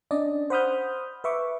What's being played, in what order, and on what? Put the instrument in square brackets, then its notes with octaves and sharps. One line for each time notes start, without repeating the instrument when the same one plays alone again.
[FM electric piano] C#4 D4 D5 D#5
C5 F#5 B5 D#6 F6 G6
B4 E5 C#6 D6